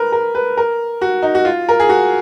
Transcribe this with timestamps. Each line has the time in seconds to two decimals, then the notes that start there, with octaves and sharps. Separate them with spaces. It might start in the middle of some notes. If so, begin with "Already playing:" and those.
Already playing: A#4 B4
0.12 A#4
0.35 B4
0.57 A#4
1.01 F#4
1.23 D#4
1.35 F#4
1.45 F4
1.69 A#4
1.80 G#4
1.89 F#4